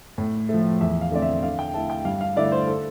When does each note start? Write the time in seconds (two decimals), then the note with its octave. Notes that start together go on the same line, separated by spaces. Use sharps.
0.18 A2
0.49 F3 A3
0.80 E2 E5
1.01 F5
1.11 D3 A3 C4 D5
1.22 E5
1.43 D3 F5
1.59 G5
1.74 A3 E4 A5
1.90 G5
2.05 G2 F5
2.21 F5
2.36 D3 A3 E4 D5
2.52 C5
2.67 A4